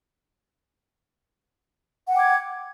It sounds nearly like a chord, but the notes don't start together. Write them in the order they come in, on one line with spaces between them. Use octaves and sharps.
F#5 G5 D6 G#6